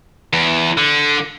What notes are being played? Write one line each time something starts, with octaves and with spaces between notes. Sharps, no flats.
E2
D3